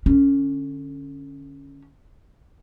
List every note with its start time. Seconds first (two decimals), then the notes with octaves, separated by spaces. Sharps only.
0.06 D3 C#4